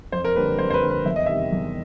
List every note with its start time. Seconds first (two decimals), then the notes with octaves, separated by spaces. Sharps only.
0.12 F2 C5
0.25 A#4
0.36 D3 G3 A#3 B4
0.59 F2 C5
0.70 C5
0.74 B4
0.82 D3 G3 A#3
0.90 B4
1.06 E2 E5
1.16 D#5
1.26 C3 D#3 G3 E5
1.52 E2